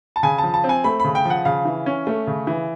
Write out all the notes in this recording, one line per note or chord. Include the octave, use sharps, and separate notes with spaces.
A5
C#3 G#5
A5
F3
A5
C4
G#5
A3 B5
C#3 B5
G5
F3 F#5
C#3 F5
E3
C#4
A3
C#3
E3